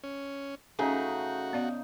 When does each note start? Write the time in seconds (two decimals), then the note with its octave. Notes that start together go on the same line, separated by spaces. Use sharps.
0.03 C#4
0.79 C#3 A3 C#4 D#4 F#4 G#4
1.53 B3 D5 F5